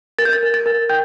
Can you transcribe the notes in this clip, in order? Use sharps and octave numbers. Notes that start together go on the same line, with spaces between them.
A#4 A6
G6
A6
A#4
A6
A#4
G5 G6